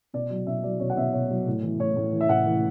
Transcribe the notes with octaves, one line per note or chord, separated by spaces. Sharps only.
B2 D5
F#3
B2 E5
F#3 D5
B2 C#5
F#5
B2 E5
B2 C#5
F#3
A2
E3
A2 C#5
A2
E3
E5
A2 F#5
E3